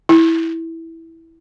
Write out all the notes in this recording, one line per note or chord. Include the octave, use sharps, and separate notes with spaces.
E4